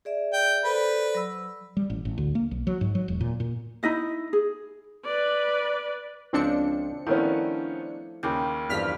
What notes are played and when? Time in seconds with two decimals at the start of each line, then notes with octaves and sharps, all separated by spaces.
0.05 G#4 D5 E5
0.33 G5
0.64 A4 B4 C5 D5
1.15 F#3 E6
1.77 G3
1.90 A1
2.05 A1
2.18 D2
2.35 A#3
2.51 B1
2.67 F#3
2.81 G#2
2.95 F#3
3.08 E1
3.21 A#2
3.40 A#2
3.83 D#4 E4 D#5 E5
4.33 G#4
5.04 B4 D5
6.33 C#2 F3 C4 D4 C#7
7.07 D#3 F3 A3 B3 C#4 E4 D5
8.23 D#2 C#3 G5 D6 G6
8.69 E2 G2 F3 F6 B6